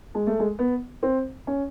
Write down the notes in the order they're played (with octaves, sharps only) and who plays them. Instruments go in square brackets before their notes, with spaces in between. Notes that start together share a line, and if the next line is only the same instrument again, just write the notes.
[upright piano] G#3
A3
G#3
B3
C4
C#4